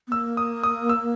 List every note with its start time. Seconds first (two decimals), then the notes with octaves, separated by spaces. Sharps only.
0.08 B3
0.12 A#3 E6
0.37 D#6
0.64 D#6
0.89 E6